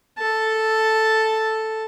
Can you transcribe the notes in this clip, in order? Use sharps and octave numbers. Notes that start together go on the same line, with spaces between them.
A4 A5